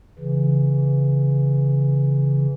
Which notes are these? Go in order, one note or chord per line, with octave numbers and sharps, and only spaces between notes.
C#3 E3